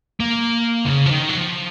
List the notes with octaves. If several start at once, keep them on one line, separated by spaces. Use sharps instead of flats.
A#3
C#3
F3
D#3
F#3
F3